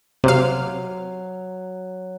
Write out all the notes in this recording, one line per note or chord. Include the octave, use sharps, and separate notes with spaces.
C3 F#3 F5